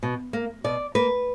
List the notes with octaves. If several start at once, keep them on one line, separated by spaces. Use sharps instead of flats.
B2
A#3
B2 D5
A#3 B4